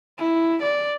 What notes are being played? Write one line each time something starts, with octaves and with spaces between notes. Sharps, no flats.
E4
D5